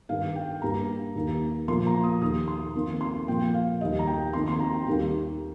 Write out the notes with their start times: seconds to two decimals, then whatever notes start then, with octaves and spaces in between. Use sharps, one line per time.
0.09 G2 D#3 G3 F5
0.36 G5
0.62 G2 G3 A#3 A#5
1.15 D#2 D#3 A#3
1.68 A#2 F3 A#3 C6
1.87 A#5
2.04 D#6
2.21 D#2 D#3 A#3 D#6
2.48 C6
2.75 F2 D#3 A#3
3.01 C6
3.27 A#2 F3 A#3 G5
3.54 F5
3.81 D#2 D#3 G3 A#3 D#5
3.99 A#5
4.07 G5
4.33 F2 D#3 A#3 C6
4.48 C6
4.60 A#5
4.73 G5
4.87 D#2 D#3 G3 A#3 G4